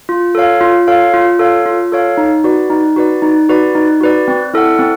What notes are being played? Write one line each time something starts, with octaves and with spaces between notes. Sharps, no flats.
F4
A4 C#5 F5
F4
A4 C#5 F5
F4
A4 C#5 F5
F4
A4 C#5 F5
D#4
F#4 B4 D5
D#4
F#4 B4 D5
D#4
F#4 B4 D5
D#4
F#4 B4 D5
C4
E4 A4 D5 F#5
C4